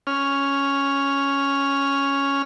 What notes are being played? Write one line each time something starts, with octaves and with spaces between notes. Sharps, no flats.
C#4 F6